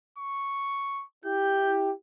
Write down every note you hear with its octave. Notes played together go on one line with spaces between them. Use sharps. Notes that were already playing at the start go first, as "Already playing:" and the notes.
C#6
E4 G4 G6